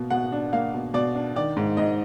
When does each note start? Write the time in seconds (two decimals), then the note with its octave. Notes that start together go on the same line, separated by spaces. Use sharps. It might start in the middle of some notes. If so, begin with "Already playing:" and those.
Already playing: B2 A#3
0.10 B2 F#5
0.32 D4
0.53 A#3 F5
0.74 B2
0.94 B2 D5
1.15 D4
1.36 D#3 D5
1.57 G#2
1.77 G#2 D#5